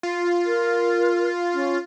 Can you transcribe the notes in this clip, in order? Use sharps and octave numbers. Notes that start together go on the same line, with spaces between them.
F4
A#4
C#4